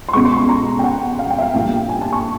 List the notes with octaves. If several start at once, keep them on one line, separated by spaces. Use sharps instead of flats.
C6
C#2 B2 G#3 B3 C#6
C6
B5
A#5
G5
F#5
F5
G5
E5
F5
A#1 A#2 G3 G5
G#5
A5
C#6